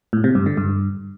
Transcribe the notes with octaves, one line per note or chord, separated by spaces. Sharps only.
A2
C3
G2
D3
G2